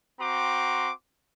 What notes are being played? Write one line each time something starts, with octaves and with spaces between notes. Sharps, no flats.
C4 F#4 G5 A#5 C6 D6